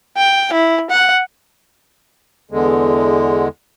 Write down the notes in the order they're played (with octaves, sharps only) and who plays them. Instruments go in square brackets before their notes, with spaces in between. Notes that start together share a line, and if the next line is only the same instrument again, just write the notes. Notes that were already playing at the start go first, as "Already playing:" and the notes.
[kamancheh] G5
E4
F#5
[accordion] E2 D3 G#3